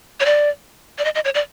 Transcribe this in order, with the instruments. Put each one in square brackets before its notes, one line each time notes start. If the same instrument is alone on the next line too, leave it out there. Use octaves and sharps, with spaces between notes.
[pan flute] C#5
D5
D5
D#5
D#5
C#5
D5